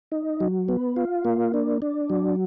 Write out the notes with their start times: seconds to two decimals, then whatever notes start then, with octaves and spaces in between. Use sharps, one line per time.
0.12 D#4
0.40 F#3
0.68 B3
0.96 F4
1.25 A#3
1.54 D4
1.82 D4
2.10 F#3